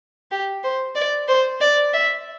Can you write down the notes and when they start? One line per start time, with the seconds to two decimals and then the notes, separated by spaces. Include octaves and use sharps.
0.31 G4
0.64 C5
0.95 D5
1.28 C5
1.61 D5
1.93 E5